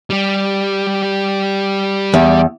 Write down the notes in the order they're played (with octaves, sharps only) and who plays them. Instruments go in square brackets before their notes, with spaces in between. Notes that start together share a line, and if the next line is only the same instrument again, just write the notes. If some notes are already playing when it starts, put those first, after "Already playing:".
[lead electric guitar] G3 G4
[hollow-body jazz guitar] E2